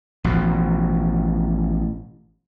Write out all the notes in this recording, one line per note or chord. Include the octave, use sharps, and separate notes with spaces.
A1 B2 F3